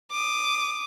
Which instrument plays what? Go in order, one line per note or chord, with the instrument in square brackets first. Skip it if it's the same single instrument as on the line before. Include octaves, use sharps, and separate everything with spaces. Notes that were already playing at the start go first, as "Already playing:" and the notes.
[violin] D6 D#6